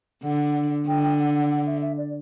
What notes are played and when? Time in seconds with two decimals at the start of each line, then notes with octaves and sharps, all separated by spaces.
0.24 D3 F#5
0.88 D3 G5
1.03 G5
1.19 F#5
1.34 F#5
1.51 F#5
1.67 E5
1.82 E5
1.98 D5